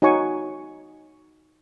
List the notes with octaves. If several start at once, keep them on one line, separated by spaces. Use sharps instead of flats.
D#4 F#4 C#5 G#5 C#6